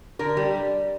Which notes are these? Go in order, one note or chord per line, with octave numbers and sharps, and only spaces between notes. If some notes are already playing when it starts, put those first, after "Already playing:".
D3 A#4
G3